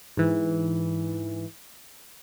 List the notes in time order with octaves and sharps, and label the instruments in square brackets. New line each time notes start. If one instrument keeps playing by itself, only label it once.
[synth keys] G#2 E3